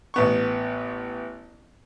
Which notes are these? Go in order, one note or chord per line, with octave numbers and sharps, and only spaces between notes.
A1 B3 C#6